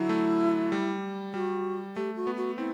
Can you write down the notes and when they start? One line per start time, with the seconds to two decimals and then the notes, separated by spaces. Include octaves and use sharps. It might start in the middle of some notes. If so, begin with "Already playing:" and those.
Already playing: D3 F#3 E4
0.09 A3
0.72 G3
1.34 G3 F#4
1.96 A3 G4
2.16 F#4
2.27 B3
2.37 F#4
2.58 C4 E4